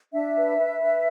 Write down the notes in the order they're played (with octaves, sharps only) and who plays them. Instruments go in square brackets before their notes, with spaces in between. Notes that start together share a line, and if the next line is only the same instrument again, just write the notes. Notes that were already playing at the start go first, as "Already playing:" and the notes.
[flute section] D4 E5
B4
B4
B4